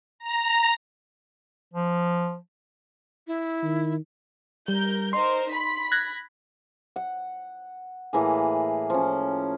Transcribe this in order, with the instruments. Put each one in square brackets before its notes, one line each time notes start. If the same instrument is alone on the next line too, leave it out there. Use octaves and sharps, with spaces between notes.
[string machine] A#5
[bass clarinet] F3
[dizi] E4
[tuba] D#3
[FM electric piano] G3 [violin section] A#4 G6
[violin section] D#4 A#4 C5 [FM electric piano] C6
[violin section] B5 B6
[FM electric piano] F#6 G#6 A#6
[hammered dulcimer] F#5
A2 E3 A#3 G#4
F3 C#4